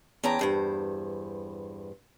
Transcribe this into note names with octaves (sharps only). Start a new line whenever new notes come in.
E2 C#4 G5 A5 A#5
E2 G2 C5